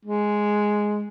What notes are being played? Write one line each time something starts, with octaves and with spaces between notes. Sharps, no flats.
G#3